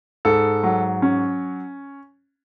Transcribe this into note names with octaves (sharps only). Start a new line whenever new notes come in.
G#2 A4
F#3
C#4